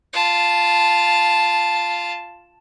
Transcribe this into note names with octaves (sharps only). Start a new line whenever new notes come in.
F4 A5